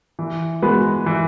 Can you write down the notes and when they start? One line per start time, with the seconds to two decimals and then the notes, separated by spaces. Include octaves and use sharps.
0.19 E3
0.62 G#3 B3 F#4 B4
1.06 E3